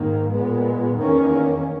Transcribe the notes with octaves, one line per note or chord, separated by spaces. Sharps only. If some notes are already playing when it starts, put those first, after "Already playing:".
Already playing: G#2 D#3 A#3
A#2 G#3 B3
E2 D#3 A#3 C#4